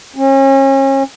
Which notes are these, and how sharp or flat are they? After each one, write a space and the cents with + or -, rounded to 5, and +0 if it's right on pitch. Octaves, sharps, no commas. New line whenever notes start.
C#4 -35